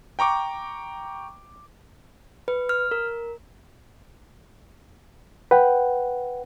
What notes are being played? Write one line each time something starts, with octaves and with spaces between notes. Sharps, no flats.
G5 A#5 C#6 D6
B4
F6
A#4
B4 F#5 G5